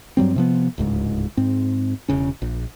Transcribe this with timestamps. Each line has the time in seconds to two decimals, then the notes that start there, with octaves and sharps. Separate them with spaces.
0.17 G2 F#3 G3 C4
0.36 C3 F3 B3
0.78 D1 C#2 G#2
1.37 G#2 C4
2.09 E1 C#3 C#4
2.42 A#1